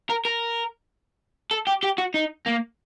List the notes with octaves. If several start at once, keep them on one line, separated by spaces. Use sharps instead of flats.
A#4
A#4
A4
G4
G4
F#4
D#4
A#3